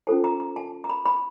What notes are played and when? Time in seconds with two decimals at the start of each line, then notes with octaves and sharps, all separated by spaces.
0.07 C#4 F4 A4 C5 A5
0.24 A#5
0.40 A#5
0.56 A5
0.84 A#5
0.89 B5
1.06 B5